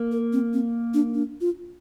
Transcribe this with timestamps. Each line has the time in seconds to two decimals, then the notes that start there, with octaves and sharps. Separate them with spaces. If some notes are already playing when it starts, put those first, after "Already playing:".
Already playing: A#3
0.12 A#4
0.33 C4
0.53 C4
0.94 D4
1.14 D4
1.41 F4